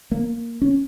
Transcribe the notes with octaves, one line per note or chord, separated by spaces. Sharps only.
A#3
C#4